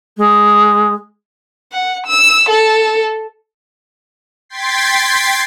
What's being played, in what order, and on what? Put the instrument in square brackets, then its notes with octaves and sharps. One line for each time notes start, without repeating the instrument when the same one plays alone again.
[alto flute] G#3
[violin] F#5
E6
A4
[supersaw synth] G5 C6 G#6 A6 B6 C7